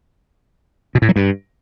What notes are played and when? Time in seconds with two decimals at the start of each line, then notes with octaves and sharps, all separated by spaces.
0.95 B2
1.02 A2
1.09 F#3
1.16 G2